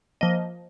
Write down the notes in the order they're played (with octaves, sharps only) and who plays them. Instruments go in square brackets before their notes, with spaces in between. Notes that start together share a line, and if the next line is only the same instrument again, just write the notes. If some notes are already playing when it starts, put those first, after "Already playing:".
[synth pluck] F3 A#3 D#5